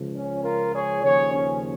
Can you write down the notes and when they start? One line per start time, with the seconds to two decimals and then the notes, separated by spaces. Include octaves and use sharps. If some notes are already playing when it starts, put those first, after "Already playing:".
Already playing: C#2 C#3 F3
0.15 C#4
0.44 F4 A#4
0.74 G#4 C#5
1.03 D#2 C#3 F3 G#4 C#5
1.32 C#4